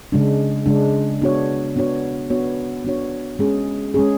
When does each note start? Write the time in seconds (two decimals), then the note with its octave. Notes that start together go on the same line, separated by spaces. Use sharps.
0.12 C#3 G#3 D4
0.66 C#3 G#3 D4
1.22 B3 D4 F#4 C#5
1.76 B3 D4 F#4 C#5
2.30 B3 D4 F#4 C#5
2.85 B3 D4 F#4 C#5
3.39 G#3 C#4 G#4
3.94 G#3 C#4 G#4